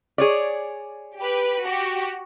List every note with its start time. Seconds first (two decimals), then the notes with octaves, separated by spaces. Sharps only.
0.18 G#4 C#5 D5
1.18 G4 B4
1.62 F#4 G4